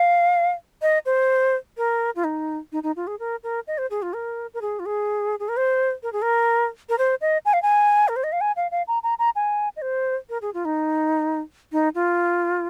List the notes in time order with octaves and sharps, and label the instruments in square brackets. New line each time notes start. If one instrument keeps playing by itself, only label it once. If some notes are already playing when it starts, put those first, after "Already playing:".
Already playing: [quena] F5
D#5
C5
A#4
F4
D#4
D#4
D#4
F4
G#4
A#4
A#4
D#5
C5
G#4
F4
A#4
A#4
G#4
F4
G#4
G#4
A#4
C5
A#4
G#4
A#4
A#4
C5
D#5
G#5
F5
G#5
A#4
C5
D#5
F5
G#5
F5
F5
A#5
A#5
A#5
G#5
D#5
C5
A#4
G#4
F4
D#4
D#4
F4